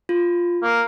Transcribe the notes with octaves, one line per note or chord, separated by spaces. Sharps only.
F4
A#3